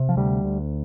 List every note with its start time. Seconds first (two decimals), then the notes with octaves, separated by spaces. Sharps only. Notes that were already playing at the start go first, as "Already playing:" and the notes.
Already playing: C3
0.09 F3
0.17 D2 G3
0.44 D2